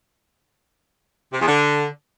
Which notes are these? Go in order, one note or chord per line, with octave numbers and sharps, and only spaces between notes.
C3
E2
D3